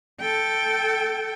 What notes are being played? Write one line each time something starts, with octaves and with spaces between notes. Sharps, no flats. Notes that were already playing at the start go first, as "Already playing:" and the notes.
A4 G5